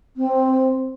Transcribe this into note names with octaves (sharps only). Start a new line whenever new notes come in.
C4